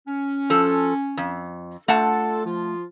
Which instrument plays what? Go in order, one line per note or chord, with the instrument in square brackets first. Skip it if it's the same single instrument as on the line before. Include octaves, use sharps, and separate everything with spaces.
[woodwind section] C#4
[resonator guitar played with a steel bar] F3 A4
F2
[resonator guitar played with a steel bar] A3 F#5 A5 [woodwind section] D4 F4 A4
[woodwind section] F3 F4